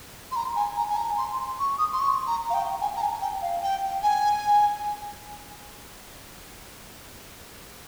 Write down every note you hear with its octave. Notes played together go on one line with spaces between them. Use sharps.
C6
A#5
G#5
A#5
G#5
A#5
C6
C#6
D#6
C6
C#6
A#5
F5
G5
G#5
A#5
G#5
G5
F5
G5
G#5